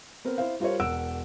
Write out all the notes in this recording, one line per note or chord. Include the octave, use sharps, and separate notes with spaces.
B3 C4 A#4
E4 C5 F5
G3 F4 A#4 C5 C#5
E1 A#4 F#5 E6 D7